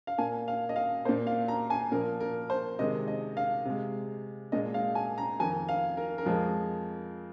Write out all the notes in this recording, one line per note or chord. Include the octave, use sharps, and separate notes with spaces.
F5
A#2 A#3 G#5
F5
D#5
F5
A#2 A#3 C5
F5
A#5
G#5
A#2 F3 A#3 A#4
A#4
C5
C3 D#3 G#3 D#5
D#5
F5
C3 G#3
A#2 G#3 D#5
F5
G#5
A#5
F2 D#3 A#3 G#5
F5
A#4
A#4
F2 F3 G#3